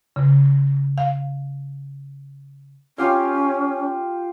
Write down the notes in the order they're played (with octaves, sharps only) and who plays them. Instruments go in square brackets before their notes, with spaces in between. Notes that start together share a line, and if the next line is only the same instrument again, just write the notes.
[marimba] C#3
F5
[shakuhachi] C#4 [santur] F4 G4 F5